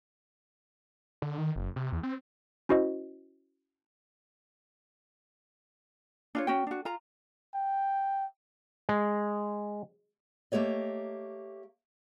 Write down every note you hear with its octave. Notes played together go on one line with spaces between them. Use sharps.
D3
D#3
F#1
C3
E2
C4
C#4 E4 F#4 C5 D#5
D4 F4 C#5
C#4 F#4 G5
D4 F#4
F4 A#5
G5
G#3
A3 A#3 G4 C#5 D#5